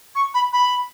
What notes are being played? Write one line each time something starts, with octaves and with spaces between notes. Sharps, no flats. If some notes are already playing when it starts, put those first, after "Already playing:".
C#6
B5
B5